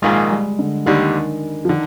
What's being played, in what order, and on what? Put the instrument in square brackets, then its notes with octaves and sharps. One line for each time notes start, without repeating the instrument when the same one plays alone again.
[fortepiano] A#1 G#2 D#3 A#3 F4 [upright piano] G#3
[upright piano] G3
D3
[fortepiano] D#2 D3 G3 [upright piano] D#3
[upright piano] F3
[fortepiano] D3 [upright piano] D#3